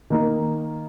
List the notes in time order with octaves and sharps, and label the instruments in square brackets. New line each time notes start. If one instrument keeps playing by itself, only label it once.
[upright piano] D#3 A#3 D#4